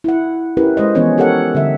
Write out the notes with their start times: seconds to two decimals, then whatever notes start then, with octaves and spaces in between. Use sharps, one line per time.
0.04 E4 F#5
0.57 C#4 E4 G4 A#4 B4
0.77 G#3 C5 D#5
0.95 E3 F3 B3 C#4 C5 C#5
1.18 G4 A4 A#4 C#5 F#5
1.55 D3 G3 E5